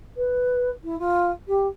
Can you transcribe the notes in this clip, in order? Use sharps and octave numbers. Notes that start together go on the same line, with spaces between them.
B4
E4
F4
G4